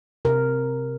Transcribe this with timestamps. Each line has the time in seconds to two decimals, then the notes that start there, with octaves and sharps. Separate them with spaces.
0.25 C3 A#4